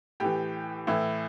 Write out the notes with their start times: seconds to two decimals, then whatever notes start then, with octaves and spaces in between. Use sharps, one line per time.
0.20 A2 E3 G4
0.87 A2 E3 E4